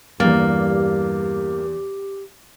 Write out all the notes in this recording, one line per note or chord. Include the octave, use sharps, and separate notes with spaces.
E2 G2 A#3 G4 A6